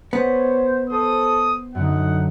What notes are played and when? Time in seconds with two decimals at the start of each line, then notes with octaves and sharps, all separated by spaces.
0.13 B3 C5 C#5
0.90 A4 C5 D#6
1.75 F#2 D3 D#4 F#5